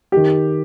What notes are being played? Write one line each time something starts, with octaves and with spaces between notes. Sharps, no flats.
D#3 G4